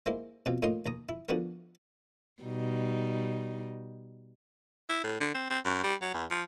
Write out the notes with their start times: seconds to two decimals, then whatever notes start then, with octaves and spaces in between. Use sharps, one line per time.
0.06 G#3 A#3 E4 C5
0.46 B2 C4 F4
0.62 A2 A#3 D#4 F4 D#5 C6
0.86 D#2 A#5 D#6
1.09 E4
1.29 D3 F3 B3 F#4 A#4
2.42 B2 G3 D#4
4.89 E4
5.04 A2
5.20 D3
5.34 C4
5.50 C4
5.65 F#2
5.83 G3
6.01 F#3
6.14 E2
6.30 F3